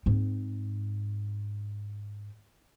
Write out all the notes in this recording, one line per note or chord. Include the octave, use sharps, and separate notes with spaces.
G#2 C4